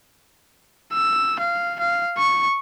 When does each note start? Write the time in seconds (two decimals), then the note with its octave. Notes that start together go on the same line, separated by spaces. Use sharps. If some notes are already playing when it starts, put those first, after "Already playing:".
0.93 E6
1.40 F5
1.80 F5
2.18 C#6